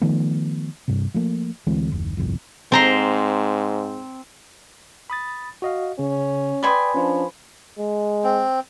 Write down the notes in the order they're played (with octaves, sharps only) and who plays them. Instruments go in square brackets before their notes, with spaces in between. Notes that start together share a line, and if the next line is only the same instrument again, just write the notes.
[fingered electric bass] D#3 F3 A3 B3
G2 C3
F3 A3 A#3
D2 E3 G#3 C4
F#1 D#2
G1 C2 F2
[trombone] G#2 [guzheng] C4 A#5 C6
[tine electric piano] B5 D#6 A6
F#4 D#5 F5
[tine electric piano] C#3 [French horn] C#4
[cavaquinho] B4 G#5 C6 [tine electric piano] D5 G5 D#6
[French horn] F3 [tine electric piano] C#4 D4
[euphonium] G#3
[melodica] C4